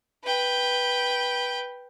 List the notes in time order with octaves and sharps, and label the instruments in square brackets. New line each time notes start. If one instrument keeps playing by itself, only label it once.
[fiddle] B4 G5